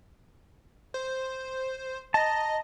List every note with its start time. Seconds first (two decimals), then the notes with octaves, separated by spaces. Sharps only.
0.94 C5
2.14 D#5 A5 A#5